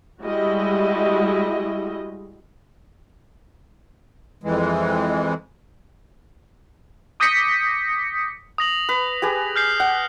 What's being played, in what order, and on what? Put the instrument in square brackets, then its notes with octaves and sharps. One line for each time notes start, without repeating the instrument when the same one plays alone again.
[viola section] G3 G#3 E4 F#4 D#5
[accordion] F2 E3 G#3
[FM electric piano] D6 D#6 G6 A#6 B6 C#7
[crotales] D#6 A#6 F#7
[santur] B4
G4 G#4 B4
[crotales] F6 G6 C7
[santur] F#5